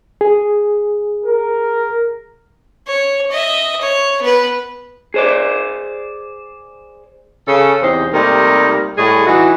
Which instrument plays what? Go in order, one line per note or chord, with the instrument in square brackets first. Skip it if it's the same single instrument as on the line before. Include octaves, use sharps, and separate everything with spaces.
[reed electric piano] G#4
[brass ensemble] A#4
[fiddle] C#5
D#5 E5
C#5
B3 B4
[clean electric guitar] G#4 C5 D5
[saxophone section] C#3 A4
E2 C3 D#4 C5
C3 G3 A3 A#3 D#4
A2 G3 G#3 G#4
E3 D#4 E4 F#4